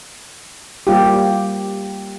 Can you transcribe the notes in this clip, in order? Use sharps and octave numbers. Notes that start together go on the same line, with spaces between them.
G3 A#3 F4 G4